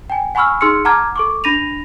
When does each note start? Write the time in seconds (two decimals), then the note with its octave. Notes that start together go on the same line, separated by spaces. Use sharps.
0.10 G5 G#5
0.35 F#5 G#5 B5 C#6 E6 F6
0.61 D#4 G#4 C6 E6 F6 C#7
0.85 F#5 A5 A#5 D6 F6 G#6
1.16 A4 C#6 D6
1.44 D4 B5 A#6 D#7 F7